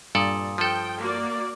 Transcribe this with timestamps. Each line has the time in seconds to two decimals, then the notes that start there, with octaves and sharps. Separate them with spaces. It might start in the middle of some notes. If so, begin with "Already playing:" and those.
0.15 G2 A#2 A4 D5 D#6
0.58 F3 A4 G5
1.00 A#3 F#4 D5